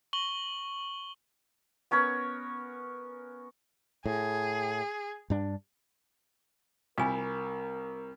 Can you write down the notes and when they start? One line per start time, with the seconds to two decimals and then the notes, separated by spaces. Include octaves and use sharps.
0.13 C#6 F#7 G7
1.91 B3 C#4 A#4 C#5
4.06 A2 G#4
5.30 G2 D4
6.98 C2 F4 A#4 G#5